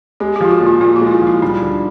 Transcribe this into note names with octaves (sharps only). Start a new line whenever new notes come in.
G#3 G4
G4
F3 F4
F#4
A#2
F4
A#2 F4
F#4
G#3
E4
F4
F3
E4
G3 D#4
D3